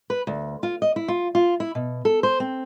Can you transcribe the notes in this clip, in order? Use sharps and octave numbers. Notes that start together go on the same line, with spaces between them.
B4
D2
F4
D#5
E4
F4
F4
E4
B2
A4
C5
C4